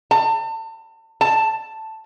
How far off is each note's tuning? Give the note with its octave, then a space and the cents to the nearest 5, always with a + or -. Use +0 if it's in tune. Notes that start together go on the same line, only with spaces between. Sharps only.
A5 +35
A5 +5